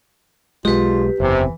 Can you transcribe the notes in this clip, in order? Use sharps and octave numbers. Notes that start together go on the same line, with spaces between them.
B1 G#3 F4 G4 B4
F#1 E2 C3 E3